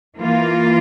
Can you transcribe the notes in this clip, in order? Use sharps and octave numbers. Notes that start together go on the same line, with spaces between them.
E3 A#3 F4